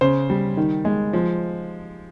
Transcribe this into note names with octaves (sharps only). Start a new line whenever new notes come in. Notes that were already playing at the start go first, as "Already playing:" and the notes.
C#3 C5
G3
D#3
G#3
F3